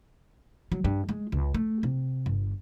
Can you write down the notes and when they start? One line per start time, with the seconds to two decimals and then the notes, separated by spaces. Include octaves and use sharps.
0.72 F#3
0.85 G2
1.09 G#3
1.32 C#2
1.54 A3
1.83 C3
2.26 G1